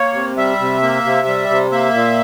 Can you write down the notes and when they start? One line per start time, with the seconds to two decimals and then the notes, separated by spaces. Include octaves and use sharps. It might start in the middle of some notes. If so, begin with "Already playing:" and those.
Already playing: A#3 C#5
0.14 C3
0.37 G3 E5
0.59 C3
0.82 A#3
1.05 C3
1.27 G3
1.50 C3
1.71 A#3 E5
1.94 A#2